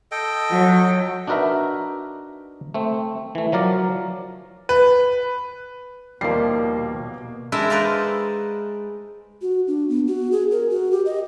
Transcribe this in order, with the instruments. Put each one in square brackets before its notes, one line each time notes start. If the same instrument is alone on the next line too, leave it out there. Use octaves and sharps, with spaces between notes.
[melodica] A4 D#5 G5
[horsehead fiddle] F#3
[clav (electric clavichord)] D4 D#4 F#4 A#4 B4 E5
A3 C4
E3 A3
F3 F#3 A#4 D5
[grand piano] B4
[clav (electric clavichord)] D#2 F3 G3 [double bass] B2 [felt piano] A#3 C7
[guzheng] G#3 D4 E4 A#4 E5
D#4 B4 C5 D5 F5
[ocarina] F#4
D4
B3
F#4
G#4
A#4
F#4
G4
D#5